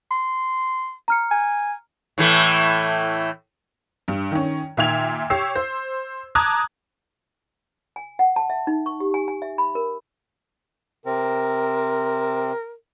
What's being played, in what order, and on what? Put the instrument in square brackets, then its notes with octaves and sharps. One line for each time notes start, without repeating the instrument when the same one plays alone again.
[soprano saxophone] C6
[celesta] A#5 F6 C#7
[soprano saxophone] G#5
[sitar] A2 E3 A3
[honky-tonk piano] G2
D#3 C#4
A#2 D#3 E5 G5 G#6 F7
G4 C#5 E6 C7
C5
A5 A#5 D6 D#6 F#6 G#6
[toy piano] G#5
F#5
A5
E5
D#4
C#6
G4
G#5
G#5
E5
B5
A#4
[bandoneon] C3 C4 [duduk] A#4